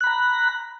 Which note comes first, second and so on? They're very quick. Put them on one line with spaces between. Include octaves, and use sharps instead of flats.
F#6 B5 A#5